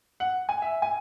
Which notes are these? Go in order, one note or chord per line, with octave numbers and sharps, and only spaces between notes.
F#5
G#5
E5
G#5